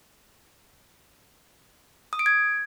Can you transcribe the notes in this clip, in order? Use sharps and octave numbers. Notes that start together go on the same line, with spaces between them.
D#6
D7
G#6